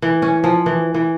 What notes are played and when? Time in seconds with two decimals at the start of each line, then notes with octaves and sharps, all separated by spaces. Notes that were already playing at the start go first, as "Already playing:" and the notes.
0.02 E3
0.22 C#4
0.44 F3
0.66 E3
0.94 E3